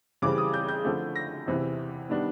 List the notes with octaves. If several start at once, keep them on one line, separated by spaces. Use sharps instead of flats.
C#3 E3 G3 C4 D6
D#6
G6
G6
D3 F3 A3
A#6
E2 C3 E3
D#3 G3 B3 D4